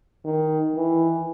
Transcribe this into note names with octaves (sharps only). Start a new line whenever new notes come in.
D#3
E3